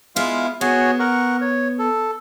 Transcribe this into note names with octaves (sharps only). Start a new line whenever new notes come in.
G#3 B3 E4 F4 F5
B3 F#4 G#4 C#5
A#4 F#5 C#6
C#5
A4